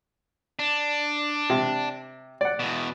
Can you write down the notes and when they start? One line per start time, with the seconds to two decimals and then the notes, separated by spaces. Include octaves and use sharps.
0.59 D4
1.50 C3
2.41 D5 F#5
2.60 E2 B2